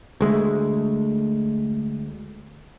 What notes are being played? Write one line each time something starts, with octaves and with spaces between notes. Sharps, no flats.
D2 G#3 A3